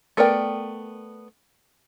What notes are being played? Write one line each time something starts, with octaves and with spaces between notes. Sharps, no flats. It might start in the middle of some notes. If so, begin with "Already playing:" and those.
A3 B3 A#4 D5 G5